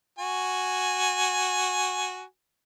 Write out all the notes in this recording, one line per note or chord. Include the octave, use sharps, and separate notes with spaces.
F#4 G#5